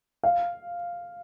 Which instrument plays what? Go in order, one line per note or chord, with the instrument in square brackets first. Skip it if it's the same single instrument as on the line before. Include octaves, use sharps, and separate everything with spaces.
[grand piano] F5